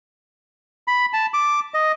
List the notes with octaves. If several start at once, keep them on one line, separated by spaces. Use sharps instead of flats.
B5
A5
D6
D#5